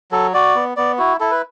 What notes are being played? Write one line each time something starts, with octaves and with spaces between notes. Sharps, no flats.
F#3 A4
F#4 D5
B3
B3 D5
E4 F#4
E4 A4
B4